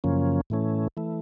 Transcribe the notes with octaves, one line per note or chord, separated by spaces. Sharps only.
F#2 C#3 F3 A#3 C#4
A2 E3 A3 C#4
E3 A3